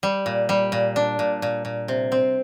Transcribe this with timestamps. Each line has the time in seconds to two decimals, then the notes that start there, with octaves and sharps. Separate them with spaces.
0.03 G3
0.26 A#2
0.49 G3
0.72 A#2
0.96 D4
1.19 A#2
1.42 A#2
1.65 A#2
1.88 C3
2.12 C4